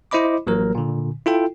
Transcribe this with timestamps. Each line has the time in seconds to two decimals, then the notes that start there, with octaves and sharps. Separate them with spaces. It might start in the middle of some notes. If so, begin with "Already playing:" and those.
0.11 E4 C5 D#5 B5 D6
0.47 A1 F#3 A#3 A#4
0.75 A#2 D3
1.26 E4 F4 A4 G5